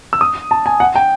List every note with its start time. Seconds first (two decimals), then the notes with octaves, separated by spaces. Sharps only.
0.13 E6
0.21 D#6
0.51 A5
0.66 G#5
0.80 F#5
0.96 G5